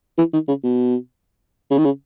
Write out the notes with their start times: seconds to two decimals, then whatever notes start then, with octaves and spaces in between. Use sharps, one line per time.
0.18 E3
0.33 D#3
0.48 C#3
0.64 B2
1.71 C#3
1.78 D#3
1.85 C#3